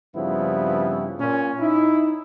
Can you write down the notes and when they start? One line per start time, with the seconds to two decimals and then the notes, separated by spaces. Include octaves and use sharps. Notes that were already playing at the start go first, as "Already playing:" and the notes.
0.15 G2 C#3 F3 B3 C4 E4
1.19 A#2 C#4
1.60 D#4 E4